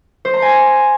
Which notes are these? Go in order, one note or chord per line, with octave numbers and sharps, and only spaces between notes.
C5
A#5
G#5